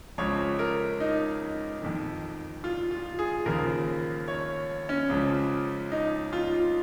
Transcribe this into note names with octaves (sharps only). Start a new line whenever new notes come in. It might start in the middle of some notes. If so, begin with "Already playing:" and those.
C#2 C#3 F3 C#5
A#4
D#4
F2 D#3
F4
F4
G#4
D#2 C#3 F3 A#4
C#5
C#4
C#2 C#3 F3
D#4
F4